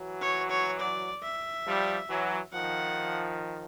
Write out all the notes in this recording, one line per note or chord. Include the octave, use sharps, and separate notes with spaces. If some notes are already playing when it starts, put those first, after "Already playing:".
Already playing: E3 F#3
C#5
C#5
D5
E5
F3 G3
E3 F#3
D#3 F3 F#5